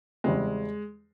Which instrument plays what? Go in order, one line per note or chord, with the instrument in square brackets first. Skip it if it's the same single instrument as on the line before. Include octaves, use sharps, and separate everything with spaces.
[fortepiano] E2 C#3 G3 C4 [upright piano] G#3